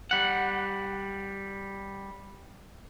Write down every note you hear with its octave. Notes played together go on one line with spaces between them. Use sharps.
G3 F#5